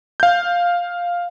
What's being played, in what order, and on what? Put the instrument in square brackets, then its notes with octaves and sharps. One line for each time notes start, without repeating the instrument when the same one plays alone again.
[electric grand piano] F5 G6